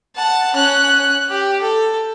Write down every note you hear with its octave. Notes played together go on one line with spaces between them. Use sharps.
F#5 A5
C#4 F#6
G4
A4